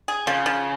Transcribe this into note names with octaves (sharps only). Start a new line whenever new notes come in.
G#4
C#3 F3
F3